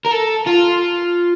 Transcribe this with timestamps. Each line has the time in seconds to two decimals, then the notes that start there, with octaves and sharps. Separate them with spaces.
0.06 A#4
0.12 A4
0.47 F4